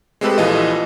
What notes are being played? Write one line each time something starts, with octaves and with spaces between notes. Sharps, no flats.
G#3 A3 C4 G4 A4 B4
A#1 E3 F4 A4 D#5